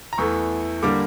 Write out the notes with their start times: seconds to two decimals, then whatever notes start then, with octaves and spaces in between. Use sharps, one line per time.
0.13 A#5
0.18 E2 E3 A3 C#6
0.83 D3 G3 A#3 D6